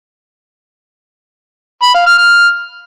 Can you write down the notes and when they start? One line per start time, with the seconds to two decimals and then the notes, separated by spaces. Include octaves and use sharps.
1.83 B5
1.95 F5
2.07 F6
2.19 F6